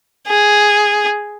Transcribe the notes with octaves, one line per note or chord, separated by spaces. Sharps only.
G#4